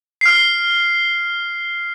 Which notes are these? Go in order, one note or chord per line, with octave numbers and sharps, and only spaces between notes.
F6 C7